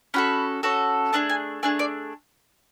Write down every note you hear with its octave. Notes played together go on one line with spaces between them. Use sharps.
C#4 F#4 A4 B5
C#4 F#4 A4
A3 D4 G#4 A5
G#5
A3 D4 G#4 G#5
D5